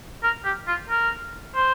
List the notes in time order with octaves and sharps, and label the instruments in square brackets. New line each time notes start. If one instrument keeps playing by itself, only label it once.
[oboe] A#4
G4
F4
A#4
C5